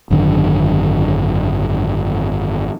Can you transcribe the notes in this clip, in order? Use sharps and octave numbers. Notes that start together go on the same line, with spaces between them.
G#1 F#2 D3 D#3